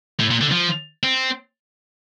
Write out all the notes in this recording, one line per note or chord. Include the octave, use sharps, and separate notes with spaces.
A2
A#2
D3
F3
C4